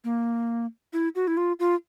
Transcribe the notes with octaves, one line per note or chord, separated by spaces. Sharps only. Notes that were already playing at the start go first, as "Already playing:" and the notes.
A#3
E4
F#4
E4
F4
F4